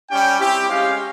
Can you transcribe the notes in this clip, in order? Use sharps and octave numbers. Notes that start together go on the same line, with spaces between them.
G3 C#4 G4 G5
C4 E4 G4
G#3 C#4 G4 F5